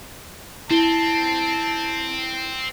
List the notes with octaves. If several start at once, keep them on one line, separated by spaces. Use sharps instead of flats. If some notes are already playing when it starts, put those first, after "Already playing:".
C4 E4 A5 G7